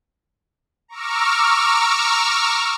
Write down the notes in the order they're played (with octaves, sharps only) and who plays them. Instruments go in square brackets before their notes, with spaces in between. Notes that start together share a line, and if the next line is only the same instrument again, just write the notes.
[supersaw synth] A#5 C#6 D6 E6 F6